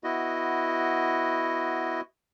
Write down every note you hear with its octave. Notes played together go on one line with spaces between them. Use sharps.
B3 E4 F#4 D#5